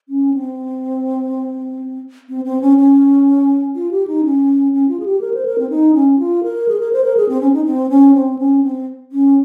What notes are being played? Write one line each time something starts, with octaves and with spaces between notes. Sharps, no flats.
C#4
C4
C4
C4
C#4
C#4
F4
G4
D#4
C#4
C#4
F4
G#4
G4
A#4
C5
A#4
C4
D#4
C#4
F4
A#4
G#4
A#4
C5
A#4
G#4
C4
C#4
D#4
C4
C#4
C4
C#4
C4
C#4